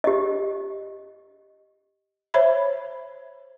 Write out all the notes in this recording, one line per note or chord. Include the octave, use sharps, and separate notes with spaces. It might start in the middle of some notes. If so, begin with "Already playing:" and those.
G4 D#5
C5 C#5 E5 B5